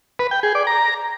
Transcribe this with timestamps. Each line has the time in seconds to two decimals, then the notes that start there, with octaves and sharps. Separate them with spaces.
0.19 B4
0.31 G5
0.43 G#4
0.55 D5
0.67 A#5